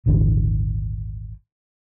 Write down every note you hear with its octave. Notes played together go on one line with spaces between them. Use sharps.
D#1 G#1 D3 E3